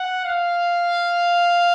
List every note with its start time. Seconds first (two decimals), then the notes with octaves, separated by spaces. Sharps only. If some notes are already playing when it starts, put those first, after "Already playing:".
Already playing: F#5
0.25 F5